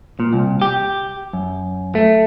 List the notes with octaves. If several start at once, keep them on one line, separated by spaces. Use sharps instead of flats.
A#2
C2
G4
F#2
A3